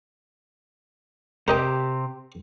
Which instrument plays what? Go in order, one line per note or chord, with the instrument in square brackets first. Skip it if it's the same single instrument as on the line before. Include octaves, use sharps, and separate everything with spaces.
[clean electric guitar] C3 [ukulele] G4 [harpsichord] A#4 D#5 G5